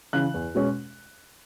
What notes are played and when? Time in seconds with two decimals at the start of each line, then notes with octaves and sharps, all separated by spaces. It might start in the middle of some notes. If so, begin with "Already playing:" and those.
0.13 C#3 E3 F#6
0.34 E2
0.55 B2 G#3 C#4